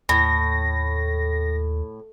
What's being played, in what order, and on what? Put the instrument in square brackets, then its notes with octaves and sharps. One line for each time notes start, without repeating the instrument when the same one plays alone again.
[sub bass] D#2 [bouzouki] A2 [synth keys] A#6